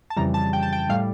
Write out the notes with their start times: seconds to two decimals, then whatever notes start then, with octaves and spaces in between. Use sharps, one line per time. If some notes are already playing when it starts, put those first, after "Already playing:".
0.10 A5
0.17 F2 C#3 E3 G3 A#5
0.34 A5
0.53 G5
0.63 A5
0.73 G5
0.89 A2 G3 F5